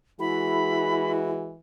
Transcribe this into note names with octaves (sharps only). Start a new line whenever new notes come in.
E3 G#3 E4 F#4 G#4 B5